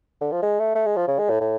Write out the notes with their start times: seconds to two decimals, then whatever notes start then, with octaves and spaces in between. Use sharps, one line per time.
0.21 D3
0.32 F3
0.43 G#3
0.60 A3
0.75 A3
0.86 G#3
0.97 F3
1.08 C#3
1.19 G#3
1.30 A2
1.41 A2